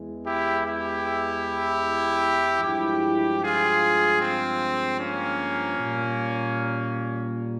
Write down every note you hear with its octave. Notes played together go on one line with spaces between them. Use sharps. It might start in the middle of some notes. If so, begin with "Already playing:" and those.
Already playing: E2 E3 G#3
E4 G4
E4 G4
G2 F3 G#3 E4 G4
F4 G#4
C4
A#3 C#4
A#2 G3